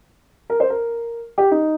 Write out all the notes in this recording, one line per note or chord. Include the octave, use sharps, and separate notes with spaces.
A#4
C5
A#4
G4
D#4